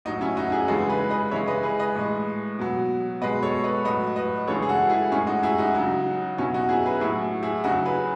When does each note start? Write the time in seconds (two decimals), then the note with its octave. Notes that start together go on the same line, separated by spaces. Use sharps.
0.05 A2 F#3 D#4
0.21 C#4 E4
0.37 D#4 F#4
0.52 E4 G#4
0.68 C#3 E3 G#3 F#4 A4
0.89 G#4 B4
1.10 B4 D#5
1.31 C#3 E3 G#3 C#5 E5
1.47 B4 D#5
1.63 G#4 B4
1.79 B4 D#5
1.95 A2 E3 G#3
2.59 B2 F#3
3.21 B2 G#3 B4 D#5
3.43 A4 C#5
3.64 B4 D#5
3.84 A2 F#3 B4 D#5
4.16 B4 D#5
4.47 C#3 E3 G#3 A4 C#5
4.62 G#4
4.69 F#4 A4
4.90 E4 G#4
5.11 A2 C#4 E4
5.16 G#3
5.27 D#4 F#4
5.43 E4 G#4
5.58 D#4 F#4
5.75 C#3 F#3
6.38 B2 F#3 C#4 E4
6.54 D#4 F#4
6.69 E4 G#4
6.86 G#4 B4
7.00 A2 F#3 E4 G#4
7.43 E4 G#4
7.64 C#3 F#3 D#4 F#4
7.86 G#4 B4